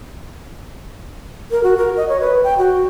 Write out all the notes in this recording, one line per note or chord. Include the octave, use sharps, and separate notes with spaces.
A#4
F#4
A#4
D#5
C#5
B4
G5
F#4